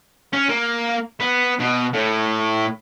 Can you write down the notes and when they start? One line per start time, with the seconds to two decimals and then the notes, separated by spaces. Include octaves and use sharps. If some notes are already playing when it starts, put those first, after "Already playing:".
0.33 C#4
0.49 A#3
1.20 B3
1.59 B2
1.93 A2